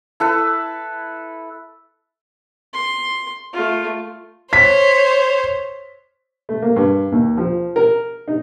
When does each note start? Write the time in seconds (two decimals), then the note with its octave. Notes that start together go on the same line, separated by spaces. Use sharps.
0.20 E4 A4 B4
2.74 C6
3.53 A3 F4
4.53 C5 C#5 B6
6.49 A3
6.62 A#3
6.76 G2
7.12 D#2
7.37 F3
7.76 A#4
8.28 D#4